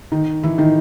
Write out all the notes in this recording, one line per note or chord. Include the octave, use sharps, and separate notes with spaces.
D#3 D#4
E3 E4
D#3 D#4